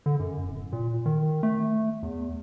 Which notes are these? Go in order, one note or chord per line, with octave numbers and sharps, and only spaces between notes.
D3
F#2
D1
A#2
D#3
A3
E2